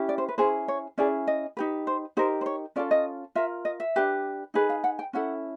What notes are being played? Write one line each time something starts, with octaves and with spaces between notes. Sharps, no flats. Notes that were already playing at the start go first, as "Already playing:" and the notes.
Already playing: C#4 E4 G4
D5
C5
B4
C#4 E4 G#4 C5
C#5
C#4 E4 G#4 D5
D#5
D#4 G4 B4
C5
D#4 G4 A#4 C5
C5
C#5
C#4 F4 A4 D5
D#5
F4 A#4 E5
D#5
E5
D4 G4 B4
D#4 G#4 B4
F5
F#5
G5
C#4 E4 A4 F#5